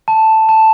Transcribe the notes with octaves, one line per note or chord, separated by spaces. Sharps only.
A5
A5